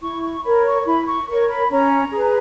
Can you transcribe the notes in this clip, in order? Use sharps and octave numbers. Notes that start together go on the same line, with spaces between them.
E4 C#6
C#6
A#4 C#5 B5
C#6
E4 B5
C#6
A#4 C#5 C#6
B5
C#4 A#5
G#4 B4